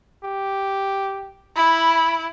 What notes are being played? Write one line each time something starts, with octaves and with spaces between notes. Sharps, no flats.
G4
E4 B5